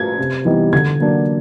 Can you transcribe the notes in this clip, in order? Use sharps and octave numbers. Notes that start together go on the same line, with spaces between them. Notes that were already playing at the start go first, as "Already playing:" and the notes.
Already playing: G#6
C3
E3 G3 B3 D#4
D3 G#6
F#3 A#3 D4